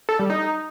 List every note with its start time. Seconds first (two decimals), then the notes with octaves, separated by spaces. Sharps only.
0.09 A4
0.19 G3
0.30 D#4